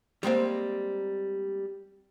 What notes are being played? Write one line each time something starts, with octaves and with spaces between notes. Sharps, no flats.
G3 G#3 A#3 C4